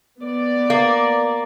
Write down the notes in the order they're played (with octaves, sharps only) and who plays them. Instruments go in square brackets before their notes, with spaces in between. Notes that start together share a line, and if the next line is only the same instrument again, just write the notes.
[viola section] B3 D5
[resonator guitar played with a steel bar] A#3